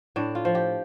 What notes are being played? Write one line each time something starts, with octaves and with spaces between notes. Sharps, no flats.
A2 D4
F4
F3
G4